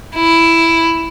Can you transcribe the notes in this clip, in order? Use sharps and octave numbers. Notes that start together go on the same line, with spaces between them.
E4